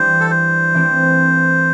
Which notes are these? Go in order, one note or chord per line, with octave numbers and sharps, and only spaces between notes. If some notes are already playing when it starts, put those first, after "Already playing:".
Already playing: E3 G3 D4 C5
A4
C5
E3 A3 C4 E4